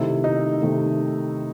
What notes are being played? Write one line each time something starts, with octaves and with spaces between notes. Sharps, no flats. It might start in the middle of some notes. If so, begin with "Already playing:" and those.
Already playing: C3 D#3 A3 E4
D#4
C3 D#3 A3